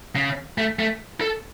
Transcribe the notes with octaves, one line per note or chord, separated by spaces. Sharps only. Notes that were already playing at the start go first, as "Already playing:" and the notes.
C#3
A3
A3
A4